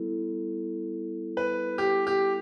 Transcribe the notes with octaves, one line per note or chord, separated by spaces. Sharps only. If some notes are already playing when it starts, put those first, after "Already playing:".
Already playing: G3 B3 E4 A4
B4
G4
G4